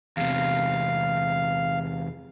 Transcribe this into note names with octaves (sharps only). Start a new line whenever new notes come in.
E2 C3 F5